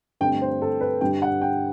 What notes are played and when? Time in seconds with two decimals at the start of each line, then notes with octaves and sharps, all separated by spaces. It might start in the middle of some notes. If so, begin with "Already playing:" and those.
0.20 G2 D3 A3 C4 G5
0.42 C5
0.62 A4
0.81 B4
1.01 G2 D3 G3 D4 G5
1.22 F#5
1.41 G5